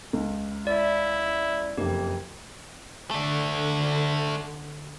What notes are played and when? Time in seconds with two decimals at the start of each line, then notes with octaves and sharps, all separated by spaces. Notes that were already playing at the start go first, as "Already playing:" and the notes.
0.13 C#2
0.67 E4 D5 E5
1.78 F#1 F2 G4
3.11 D3 A3 D4